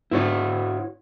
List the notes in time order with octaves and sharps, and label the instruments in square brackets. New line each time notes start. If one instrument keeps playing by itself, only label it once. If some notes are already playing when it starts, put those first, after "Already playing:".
[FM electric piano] G#2 B3 [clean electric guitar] E4 F#4 C#5